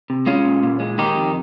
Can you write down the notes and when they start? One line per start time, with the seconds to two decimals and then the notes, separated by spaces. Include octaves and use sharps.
0.10 C3
0.27 G#3 C#4 F4
0.45 A#2
0.63 A#2
0.80 G#3
0.98 D#3 D#4 G4
1.15 F2